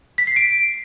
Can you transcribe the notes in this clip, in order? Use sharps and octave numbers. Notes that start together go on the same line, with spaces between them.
B6
C7
D7